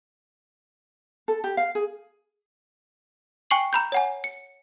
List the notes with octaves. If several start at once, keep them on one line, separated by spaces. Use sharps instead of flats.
A4
G4
F5
G#4
G5 G#5 C#6 C7 F#7
A#5 B5 G6
C#5 F#5 G#5
C#7